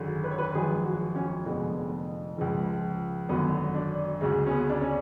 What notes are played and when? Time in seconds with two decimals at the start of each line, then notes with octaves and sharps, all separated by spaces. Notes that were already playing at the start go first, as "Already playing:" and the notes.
Already playing: G#1 F#2 D3 G#3
0.24 B4
0.31 C#5
0.38 B4
0.55 G#1 F#2 F3 G#3 G#4
0.85 F#4
1.15 C#4
1.46 F1 F2 D3 F3 G#3 B3
2.37 C#2 C#3 F3 G#3
3.29 G#1 F#2 D3 B3
3.75 D4
4.21 D2 C#3 G#3
4.46 C#4
4.51 B3
4.70 D4
4.81 C#4